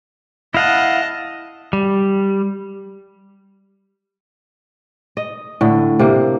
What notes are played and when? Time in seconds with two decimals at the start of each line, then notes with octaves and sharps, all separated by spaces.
0.54 E4 D#5 F5 F#5 A5
1.73 G3
5.17 D#5
5.61 A2 D3
5.99 C3 A#3